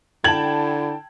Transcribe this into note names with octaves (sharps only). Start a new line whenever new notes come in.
D3 E4 G5 A5 G#6 F#7